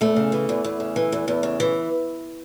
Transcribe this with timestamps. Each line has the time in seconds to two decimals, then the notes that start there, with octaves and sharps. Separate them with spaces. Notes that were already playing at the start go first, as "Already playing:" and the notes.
0.01 E2 A3
0.16 C#3
0.32 E3
0.49 E2
0.64 E2
0.80 C#3
0.96 E3
1.12 E2
1.28 E2
1.43 C#3
1.60 E3